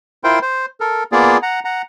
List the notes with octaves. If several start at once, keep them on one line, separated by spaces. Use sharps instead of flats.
E4 F4 A#4 C5 G5 C6
C5
A4 A#4
A#3 B3 F4 G#4 D5
F#5 A#5
F#5 A#5